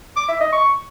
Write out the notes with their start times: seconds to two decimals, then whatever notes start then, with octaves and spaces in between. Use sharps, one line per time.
0.17 D6
0.28 E5
0.40 D#5
0.52 C#6